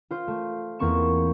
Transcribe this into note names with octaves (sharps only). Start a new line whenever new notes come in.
F4 C5
A3
E2 A#3 C4 C#6 E7